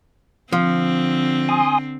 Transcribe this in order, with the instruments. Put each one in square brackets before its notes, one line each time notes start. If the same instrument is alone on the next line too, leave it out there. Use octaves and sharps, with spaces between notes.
[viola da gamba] D3 C4 [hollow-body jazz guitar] F3
[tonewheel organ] G#5 C6 D#6